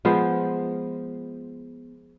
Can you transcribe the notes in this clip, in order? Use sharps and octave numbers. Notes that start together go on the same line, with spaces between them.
F3 G#3 B3 C5